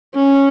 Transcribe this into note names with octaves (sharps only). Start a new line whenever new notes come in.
C#4